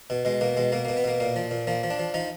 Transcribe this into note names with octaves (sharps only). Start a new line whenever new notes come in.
B2
B2 G#3
B2 A#3
B2 G#3
B2 A#3
B2 A#3
B3
B2 A#3
A#2 A#3
F3
A#2
F3 A#3
F3
D4
F3
F3 D#4